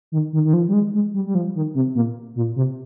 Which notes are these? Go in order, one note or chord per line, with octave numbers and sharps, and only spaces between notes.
D#3
D#3
D#3
F3
G3
G#3
G#3
G3
G3
F3
D#3
C3
A#2
A#2
C3